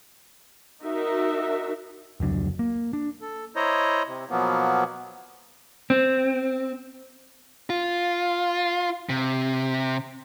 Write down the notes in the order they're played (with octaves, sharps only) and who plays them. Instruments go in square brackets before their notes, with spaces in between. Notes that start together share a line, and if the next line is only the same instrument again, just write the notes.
[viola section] D#4 F#4 A#4 E5
[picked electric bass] F1 C#2 F#3 D4
A#3
D4
[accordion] A4
E4 C5 C#5 D#5 A#5
C3
B2 F3 F#3 A#3 B3
[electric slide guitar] C4
[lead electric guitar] F4
C3